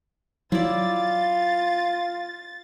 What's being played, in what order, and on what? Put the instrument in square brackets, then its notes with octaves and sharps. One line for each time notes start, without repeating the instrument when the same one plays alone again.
[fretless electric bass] F#3 [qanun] E4 D5 [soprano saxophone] F4 [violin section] A6